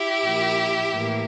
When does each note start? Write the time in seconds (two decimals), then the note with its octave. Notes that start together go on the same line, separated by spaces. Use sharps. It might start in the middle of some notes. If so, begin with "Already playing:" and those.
Already playing: E4 G4
0.24 A#2 F3 A#3
0.93 A2 E3 A#3